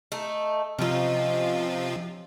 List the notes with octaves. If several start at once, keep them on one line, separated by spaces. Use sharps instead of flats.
A3 D#4
C3 F3 C#4 D#4 F4